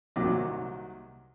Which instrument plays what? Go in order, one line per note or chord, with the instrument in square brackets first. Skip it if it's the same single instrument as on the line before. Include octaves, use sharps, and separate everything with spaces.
[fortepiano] C2 A#2 D#3 F#3 D6